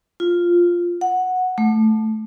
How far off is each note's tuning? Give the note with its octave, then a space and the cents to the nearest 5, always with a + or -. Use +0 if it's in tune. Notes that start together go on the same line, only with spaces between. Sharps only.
F4 +0
F#5 -5
A3 -5